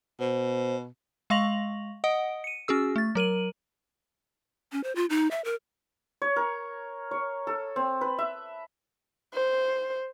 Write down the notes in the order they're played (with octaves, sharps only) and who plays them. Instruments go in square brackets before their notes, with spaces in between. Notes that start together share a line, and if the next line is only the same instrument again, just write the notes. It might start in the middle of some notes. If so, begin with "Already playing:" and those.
[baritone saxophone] B2 [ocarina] C5
[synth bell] G#3 F5 C#6 A#6 F7 F#7
D#5 F#5 D#6 D7
C#7 D#7
C#4 F#4 G#4 E6
A3 A6
F#3 A#4 D#7 F#7
[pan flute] C#4
C5
F4
D#4
E5
A#4
[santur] C#5
A#4
C#5
A4
C4
B4
E5
[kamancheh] C5